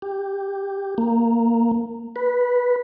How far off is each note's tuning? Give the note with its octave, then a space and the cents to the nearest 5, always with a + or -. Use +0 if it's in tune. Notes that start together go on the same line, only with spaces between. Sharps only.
G4 +10
A#3 -5
B4 -10